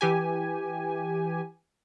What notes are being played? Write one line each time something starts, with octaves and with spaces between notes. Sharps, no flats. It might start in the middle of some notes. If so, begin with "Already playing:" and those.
E3 G4 G#5